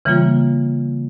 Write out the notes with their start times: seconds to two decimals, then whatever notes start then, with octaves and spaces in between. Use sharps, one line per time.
0.05 C#3 E3 G3 A#3 F4